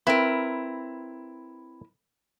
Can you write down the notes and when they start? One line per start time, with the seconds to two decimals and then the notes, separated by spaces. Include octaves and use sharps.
0.07 C4 E4 A#4 B4